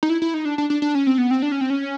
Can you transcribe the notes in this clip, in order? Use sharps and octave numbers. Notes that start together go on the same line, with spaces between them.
D#4
E4
E4
D#4
D4
D4
D4
D4
C#4
C4
B3
C4
D4
C#4
C4
C#4